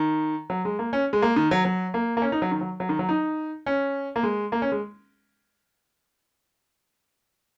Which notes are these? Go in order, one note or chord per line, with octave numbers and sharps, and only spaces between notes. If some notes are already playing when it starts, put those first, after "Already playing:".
Already playing: D#3
F#3
G#3
A#3
C#4
G#3
A#3
D#3
F#3
F#3
A#3
A#3
C#4
D#4
F#3
D#3
F#3
F#3
D#3
F#3
D#4
C#4
A#3
G#3
A#3
C#4
G#3